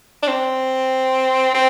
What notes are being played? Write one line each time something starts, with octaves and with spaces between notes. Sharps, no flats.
D4
C4
C4